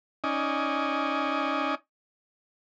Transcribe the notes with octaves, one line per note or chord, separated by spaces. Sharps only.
C#4 D#4 D5 D#5 G#5